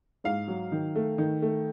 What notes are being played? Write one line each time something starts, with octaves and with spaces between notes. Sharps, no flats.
G#2 F5
F#3
D#3
A3
D#3
A3